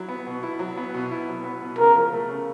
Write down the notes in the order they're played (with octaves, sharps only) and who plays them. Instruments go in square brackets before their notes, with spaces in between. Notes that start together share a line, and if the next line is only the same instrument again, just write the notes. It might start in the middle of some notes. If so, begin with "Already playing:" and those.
Already playing: [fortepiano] F#3 E4
B3
B2
E4
F#3
B3
B2
E4
F#3
B3
B2
[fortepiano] C#3 [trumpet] A#4
[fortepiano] F3
A3
C#3